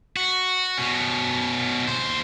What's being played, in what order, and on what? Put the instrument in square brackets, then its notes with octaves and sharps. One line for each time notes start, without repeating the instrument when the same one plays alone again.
[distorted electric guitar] F#4
B2 C#4
D#2 C5